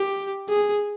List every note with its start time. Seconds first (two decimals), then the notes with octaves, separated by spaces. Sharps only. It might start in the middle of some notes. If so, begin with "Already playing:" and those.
Already playing: G4
0.49 G#4